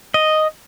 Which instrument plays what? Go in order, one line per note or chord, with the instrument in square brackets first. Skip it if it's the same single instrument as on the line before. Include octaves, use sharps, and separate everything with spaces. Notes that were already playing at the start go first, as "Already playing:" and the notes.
[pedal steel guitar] D#5